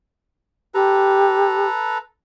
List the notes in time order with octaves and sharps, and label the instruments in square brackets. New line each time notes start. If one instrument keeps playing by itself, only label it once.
[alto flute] G4 [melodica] A4 B4 A#5